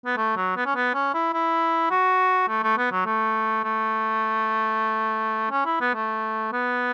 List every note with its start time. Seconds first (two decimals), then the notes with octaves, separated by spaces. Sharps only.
0.06 B3
0.17 A3
0.36 F#3
0.57 B3
0.66 C#4
0.76 B3
0.94 C#4
1.14 E4
1.34 E4
1.91 F#4
2.48 A3
2.64 A3
2.78 B3
2.92 F#3
3.06 A3
3.64 A3
5.51 C#4
5.65 E4
5.81 B3
5.94 A3
6.52 B3